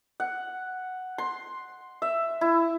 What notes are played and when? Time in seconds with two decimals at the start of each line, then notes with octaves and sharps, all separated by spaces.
0.20 F#5
1.18 C6
2.02 E5
2.41 E4